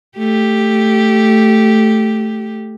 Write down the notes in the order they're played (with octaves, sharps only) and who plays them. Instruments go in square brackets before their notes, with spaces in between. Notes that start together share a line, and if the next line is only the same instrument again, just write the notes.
[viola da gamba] A3 G4